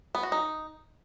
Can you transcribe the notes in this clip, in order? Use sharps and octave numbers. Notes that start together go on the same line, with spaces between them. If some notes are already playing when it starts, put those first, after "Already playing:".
B3
F#4
D#4